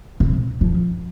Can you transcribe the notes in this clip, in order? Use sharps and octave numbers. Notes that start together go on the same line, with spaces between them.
C3
F3